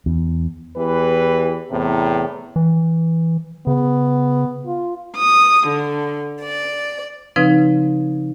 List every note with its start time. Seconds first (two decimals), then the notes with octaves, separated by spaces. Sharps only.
0.06 E2
0.75 E2 E3 G4 B4
1.71 E2 A2 C3
2.56 E3
3.67 C#3 B3
4.67 F4
5.18 D#6
5.69 D3
6.41 D5
7.36 C#3 F3 C4 D#4 B4